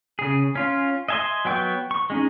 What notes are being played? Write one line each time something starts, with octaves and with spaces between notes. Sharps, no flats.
C#3 G#4
C#4 F4
D#5 E5 G#5 A5 C6
F#3 B3 G5 C#6 G6
C#6
G#3 C#4 D#4